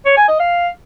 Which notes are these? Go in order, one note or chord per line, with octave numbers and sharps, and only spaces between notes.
C#5
G#5
D#5
F5